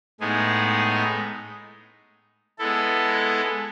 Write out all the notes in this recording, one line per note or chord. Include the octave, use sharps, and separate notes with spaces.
A2 G#3 B3 D#4 G#4
G#3 B3 E4 A4